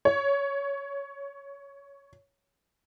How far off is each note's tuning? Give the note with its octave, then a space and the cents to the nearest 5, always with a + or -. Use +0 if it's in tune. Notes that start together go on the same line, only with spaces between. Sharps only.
C#5 +10